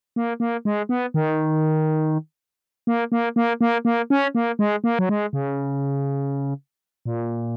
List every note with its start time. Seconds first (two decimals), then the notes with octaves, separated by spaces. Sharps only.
0.16 A#3
0.40 A#3
0.65 G#3
0.89 B3
1.14 D#3
2.87 A#3
3.12 A#3
3.36 A#3
3.61 A#3
3.85 A#3
4.10 C#4
4.35 A#3
4.59 G#3
4.84 A#3
4.99 F#3
5.09 G#3
5.33 C#3
7.05 A#2